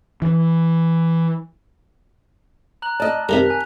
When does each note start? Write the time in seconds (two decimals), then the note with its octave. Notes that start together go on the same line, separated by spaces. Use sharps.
0.22 E3
2.82 A#5 F#6 F#7
3.00 D5 D#5 A5 F6
3.29 C3 D#3 G3 A#4 B6 F7
3.46 G#5 F#6